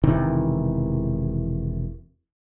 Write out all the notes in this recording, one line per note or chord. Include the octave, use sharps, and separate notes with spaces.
E1 C3 D#3 E3